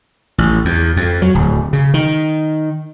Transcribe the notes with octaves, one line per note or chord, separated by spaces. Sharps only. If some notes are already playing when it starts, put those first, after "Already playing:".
A1
E2
F2
F#3
D1
C#3
D#3